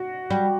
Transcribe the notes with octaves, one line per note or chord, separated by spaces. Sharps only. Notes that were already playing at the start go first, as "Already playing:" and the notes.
Already playing: F#4
G3